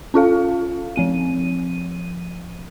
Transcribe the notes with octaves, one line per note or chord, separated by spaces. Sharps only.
C#4 F4 A4 F5
F3 C4 D#7